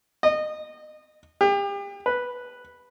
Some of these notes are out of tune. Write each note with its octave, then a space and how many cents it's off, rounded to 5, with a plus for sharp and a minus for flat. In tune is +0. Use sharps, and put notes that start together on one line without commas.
D#5 -25
G4 +35
B4 -5